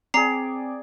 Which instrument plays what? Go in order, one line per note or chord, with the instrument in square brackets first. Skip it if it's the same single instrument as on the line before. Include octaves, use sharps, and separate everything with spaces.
[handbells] C4 [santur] G#4 D5 [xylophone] A#5 C7